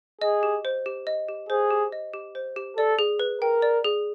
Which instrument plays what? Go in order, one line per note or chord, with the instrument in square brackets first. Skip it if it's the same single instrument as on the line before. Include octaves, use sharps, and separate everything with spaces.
[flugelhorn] G#4 [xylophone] D#5
[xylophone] G4
C5
G4
D#5
G4
[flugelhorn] G#4 [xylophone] C5
[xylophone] G4
D#5
G4
C5
G4
[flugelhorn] A4 [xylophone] D5
[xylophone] G#4
B4
[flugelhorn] A#4 [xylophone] G5
[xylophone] D5
G#4